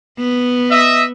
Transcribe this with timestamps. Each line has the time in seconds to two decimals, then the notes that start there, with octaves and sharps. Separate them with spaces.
0.18 B3
0.71 D#5 E5